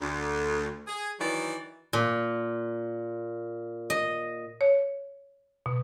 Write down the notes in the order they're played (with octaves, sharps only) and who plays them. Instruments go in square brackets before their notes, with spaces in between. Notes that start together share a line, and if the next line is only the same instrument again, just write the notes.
[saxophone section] D2
G#4
D#3 E3 F#3 D5
[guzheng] A#2
D#5
[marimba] C#5
B2